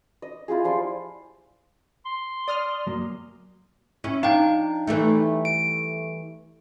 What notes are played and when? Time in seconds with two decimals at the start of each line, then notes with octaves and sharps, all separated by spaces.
0.22 D#5
0.48 E4 F4 G4 G#4
0.65 F3 D5 C6
2.06 C6
2.48 D5 D#6 F6
2.87 F#2 F#3 A#3
4.04 C#4 E4
4.23 F3 D4 D#4 F5 G5
4.87 E3 G3 A3
5.45 D7